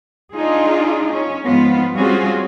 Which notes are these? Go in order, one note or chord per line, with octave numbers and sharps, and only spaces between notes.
D4 D#4 F4 G#4
C#4
G#2 F3 B3 F4
G3 C4 C#4 F4 F#4 G#4